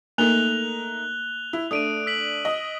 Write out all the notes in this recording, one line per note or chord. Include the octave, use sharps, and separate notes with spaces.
A3 A#3 D#4 A#4 F#6 F7 G7
E4
A3 D4 D#6 D7 D#7
E6 B6 F#7
D#5